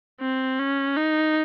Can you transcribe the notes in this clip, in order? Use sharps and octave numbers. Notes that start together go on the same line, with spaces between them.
C4
C#4
D#4